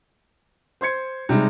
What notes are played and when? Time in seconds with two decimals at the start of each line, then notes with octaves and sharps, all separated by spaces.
0.81 C5 C6 G#6 C#7
1.29 C3 G3 G#3 D#4